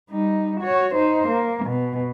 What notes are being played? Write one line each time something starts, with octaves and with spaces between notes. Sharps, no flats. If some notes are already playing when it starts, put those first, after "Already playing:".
G3 D#4
F#4 C#5
D#4 C5
A#3
B2